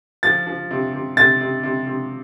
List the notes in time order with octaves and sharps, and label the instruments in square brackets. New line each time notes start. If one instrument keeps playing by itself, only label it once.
[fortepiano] F3 [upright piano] A6
[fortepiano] F3
C3
C3
[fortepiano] C3 [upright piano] A6
[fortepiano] C3
C3
C3